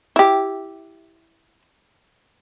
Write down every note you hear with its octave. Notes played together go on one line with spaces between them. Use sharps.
E4 G4